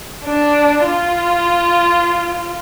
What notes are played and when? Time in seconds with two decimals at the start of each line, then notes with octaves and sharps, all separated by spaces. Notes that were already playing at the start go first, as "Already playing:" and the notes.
0.25 D4
0.86 F4